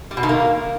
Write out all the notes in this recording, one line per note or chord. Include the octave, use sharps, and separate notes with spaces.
G3
B2
D#3
A#3